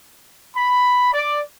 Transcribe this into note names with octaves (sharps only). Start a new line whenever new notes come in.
B5
D5